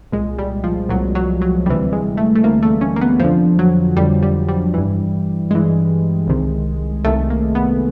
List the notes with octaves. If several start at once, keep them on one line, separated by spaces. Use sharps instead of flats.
C2 A#2 G#3
G3
F3
C2 A#2 F#3
F#3
F#3
D2 C3 E3 G3
G#3
A3
A3
D2 C3 E3 A#3
A3
C#4
A#3
B3
F2 D3 F3
F#3
F2 D3 G3
G3
G3
G2 E3
G2 E3 G#3
C2 C3 D#3
C2 C3 D#3 A3
A#3
B3